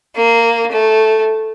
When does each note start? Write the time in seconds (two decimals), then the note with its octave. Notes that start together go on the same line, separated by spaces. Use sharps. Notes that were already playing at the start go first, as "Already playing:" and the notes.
0.16 A#3
0.71 A3